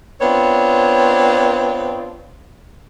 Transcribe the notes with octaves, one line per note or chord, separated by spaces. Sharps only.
B3 C4 D4 F4 C5 C#5